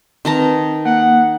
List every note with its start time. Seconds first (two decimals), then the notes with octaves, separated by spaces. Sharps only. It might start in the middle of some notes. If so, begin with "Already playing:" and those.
0.25 D#3 C4 B4 A5 A#5
0.85 A#3 F#5